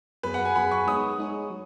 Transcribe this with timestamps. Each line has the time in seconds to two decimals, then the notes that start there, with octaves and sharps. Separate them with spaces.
0.23 F#2 F#3 B3 G#4 B4
0.34 F#5
0.45 G#5
0.56 F#2 F#3 B3 G#4 B5
0.71 C#6
0.87 G#3 D#4 G#4 C#5 D#6
1.18 G#3 D#4 G#4 C#5
1.50 F#3